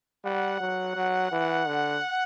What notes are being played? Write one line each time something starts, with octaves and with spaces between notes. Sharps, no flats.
G3 F#5
F#3
F#3
E3
D3